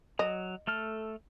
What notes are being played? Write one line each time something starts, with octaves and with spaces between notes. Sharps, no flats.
F#3 D#5
A3 A4 F6